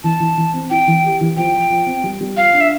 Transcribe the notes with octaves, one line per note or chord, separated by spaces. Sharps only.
E3 A5
E3
E3
C4
E4 G5
E3
G4
E3
F3 G5
F3
F3
C4
G3
G3
F4 F5
D4
E5